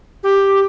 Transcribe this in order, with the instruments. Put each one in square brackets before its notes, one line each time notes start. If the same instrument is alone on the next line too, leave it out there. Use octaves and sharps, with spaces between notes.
[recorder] G4